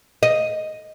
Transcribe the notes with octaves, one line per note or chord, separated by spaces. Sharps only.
D#5